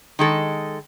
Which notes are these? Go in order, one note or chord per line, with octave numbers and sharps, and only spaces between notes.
D#3 G#3 A4